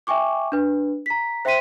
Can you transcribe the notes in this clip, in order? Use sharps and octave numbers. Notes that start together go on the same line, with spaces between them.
E5 G5 G#5 C#6 D6
D4 B4
A#5 B6
C5 E5 G5 C6 B6 D#7